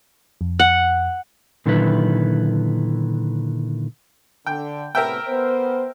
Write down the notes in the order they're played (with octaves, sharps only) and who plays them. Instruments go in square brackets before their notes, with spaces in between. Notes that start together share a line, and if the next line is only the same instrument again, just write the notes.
[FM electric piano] F2
[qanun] F#5
[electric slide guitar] A#2 D3 D#3 F#3 E4 B4
[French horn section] D3 [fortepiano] G5
[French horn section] A2 C3 B3 [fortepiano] A#4 E5 G5
[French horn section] B3 C5